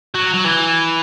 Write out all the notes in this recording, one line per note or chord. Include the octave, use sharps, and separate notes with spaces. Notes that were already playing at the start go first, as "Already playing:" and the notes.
F#3
F#3
E3